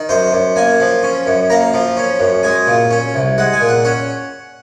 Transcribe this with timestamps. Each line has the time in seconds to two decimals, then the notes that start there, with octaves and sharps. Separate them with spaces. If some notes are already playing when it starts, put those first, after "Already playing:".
Already playing: D#3
0.09 F#2 C5
0.33 F#2
0.56 A#3 G#5
0.80 F3
1.03 C#4
1.26 F#2
1.50 A#3 A#5
1.74 F3
1.97 C#4
2.20 F#2
2.43 G#3 G#5
2.67 A#2
2.91 C#4
3.14 C2
3.38 G#3 F#5
3.53 G#5
3.61 A#2
3.69 F#5
3.85 C#4 F#5